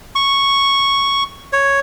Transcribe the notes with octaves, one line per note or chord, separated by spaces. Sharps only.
C#6
C#5